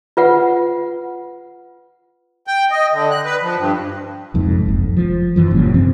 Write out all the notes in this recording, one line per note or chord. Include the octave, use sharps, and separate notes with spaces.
F4 B4 F#5
G5
D#5
D3
F#6
B4
F3
G2
C2 F2 G#2
F#1 F2
F3
F#2 E3 F3
F#1 G2 A#2 C#3
G2 C3 F3 C4